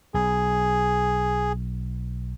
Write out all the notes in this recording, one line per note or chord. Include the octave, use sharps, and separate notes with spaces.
B1 G#4